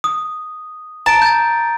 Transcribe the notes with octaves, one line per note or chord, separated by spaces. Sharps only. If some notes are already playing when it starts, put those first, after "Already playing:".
D#6
A5 A#5 D7
G6 A6